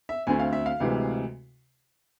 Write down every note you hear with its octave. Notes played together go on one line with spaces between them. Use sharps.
E5
D2 D3 A3 C4 G#5
F5
E5
F5
D2 C3 E3 G#3